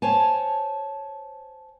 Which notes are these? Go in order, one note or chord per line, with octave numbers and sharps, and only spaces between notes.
C5 C#5 G#5 A5